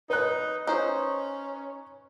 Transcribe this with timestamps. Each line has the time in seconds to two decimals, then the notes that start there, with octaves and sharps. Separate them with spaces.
0.10 D#4 B4 F#6
0.67 C#4 D#4 C5